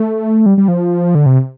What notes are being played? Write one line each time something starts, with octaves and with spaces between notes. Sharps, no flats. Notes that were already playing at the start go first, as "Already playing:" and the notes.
Already playing: A3
G3
G3
F3
D3
C3